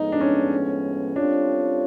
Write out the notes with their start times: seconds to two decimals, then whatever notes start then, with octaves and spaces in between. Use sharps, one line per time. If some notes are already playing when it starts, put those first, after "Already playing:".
Already playing: A2 F3 G#3 B3 D#4
0.12 D4
0.21 C#4
1.15 G3 C4 D4 F4 A4 C#5